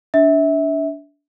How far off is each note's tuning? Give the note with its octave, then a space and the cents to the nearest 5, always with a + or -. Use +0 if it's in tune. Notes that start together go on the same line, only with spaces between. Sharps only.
D4 -25 E5 -20